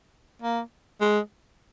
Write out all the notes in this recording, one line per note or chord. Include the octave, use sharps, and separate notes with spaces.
A#3
G#3